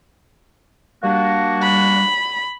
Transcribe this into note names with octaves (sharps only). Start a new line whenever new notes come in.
G3 A#3 D4 F#4
B5